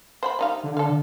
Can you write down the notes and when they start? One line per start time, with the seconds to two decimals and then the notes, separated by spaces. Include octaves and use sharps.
0.23 C5 G5 B5
0.39 G3 D#4 F5
0.64 D3
0.77 A4 F5